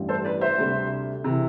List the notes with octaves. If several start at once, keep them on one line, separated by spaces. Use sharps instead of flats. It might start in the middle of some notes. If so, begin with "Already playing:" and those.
Already playing: A1 G2 E3 G3
A4 C5
B4 D5
C5 E5
D2 C3 G3
C3 E3